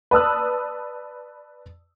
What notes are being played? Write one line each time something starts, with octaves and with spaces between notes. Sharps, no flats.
B4 D5 A5 D#6 E6 F#6